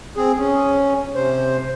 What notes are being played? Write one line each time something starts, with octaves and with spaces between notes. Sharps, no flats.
C4 G#4
C#4
C3 C5